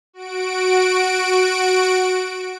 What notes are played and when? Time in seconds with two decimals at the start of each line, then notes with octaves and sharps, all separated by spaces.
0.13 F#4 D7